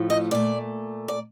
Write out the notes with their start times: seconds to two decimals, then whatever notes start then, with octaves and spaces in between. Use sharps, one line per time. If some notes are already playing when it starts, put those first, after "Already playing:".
Already playing: A2 F3 A3
0.10 D#5
0.31 A#2 A3 D5
1.08 D5